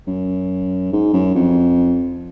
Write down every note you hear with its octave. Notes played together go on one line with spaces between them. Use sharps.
F#2
G#2
F#2
F2